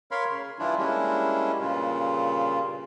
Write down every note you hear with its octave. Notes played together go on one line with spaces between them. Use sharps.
A#4 C#5 F5 B5 C6
C#3
G2 E3 D4 E4 F4
G3 G#3 A#3 C#4 D4 E4
G2 A#2 C#3 F4